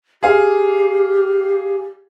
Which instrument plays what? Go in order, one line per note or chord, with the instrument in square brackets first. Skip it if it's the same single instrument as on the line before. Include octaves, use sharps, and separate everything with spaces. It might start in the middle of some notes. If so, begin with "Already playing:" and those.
[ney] G4 [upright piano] G#4 F5